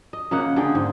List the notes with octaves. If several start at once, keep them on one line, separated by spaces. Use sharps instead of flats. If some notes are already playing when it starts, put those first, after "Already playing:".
D#5
C#3 A#3 D#5 F#5
D3 G#4 G5
G#2